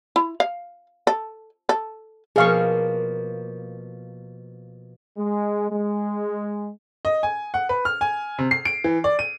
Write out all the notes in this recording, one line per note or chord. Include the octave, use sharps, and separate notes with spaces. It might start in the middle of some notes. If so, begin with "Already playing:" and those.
E4
F5
A4
A4
B2 F3 A#3 G#4 F5 C#6
G#3
G#3
D#5
G#5
F#5
B4
F6
G#5
C3
C7
D7
E3
D5
D#7